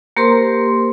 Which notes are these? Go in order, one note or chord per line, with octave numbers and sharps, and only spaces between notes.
A#3 G4 A#4 C5 A#5 C6